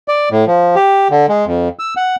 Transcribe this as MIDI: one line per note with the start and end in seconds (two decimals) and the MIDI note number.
0.08 0.29 74
0.31 0.45 45
0.47 0.75 53
0.75 1.08 67
1.11 1.26 50
1.29 1.45 56
1.47 1.69 41
1.79 1.94 88
1.97 2.16 78